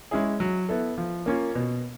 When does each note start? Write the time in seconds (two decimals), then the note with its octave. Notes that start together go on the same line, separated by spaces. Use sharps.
0.11 G#3 C#4 E4 G#4
0.40 F#3
0.69 B3 E4 A4
0.98 F3
1.26 A#3 C#4 F4
1.55 B2